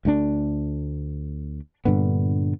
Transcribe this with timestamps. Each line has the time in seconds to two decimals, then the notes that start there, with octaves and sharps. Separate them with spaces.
0.05 D2 A3 C#4 D4
1.85 G2 A#2 D3 B3